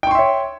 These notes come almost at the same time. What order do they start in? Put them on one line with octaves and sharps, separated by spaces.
G5 C#6 C6 E5 C#5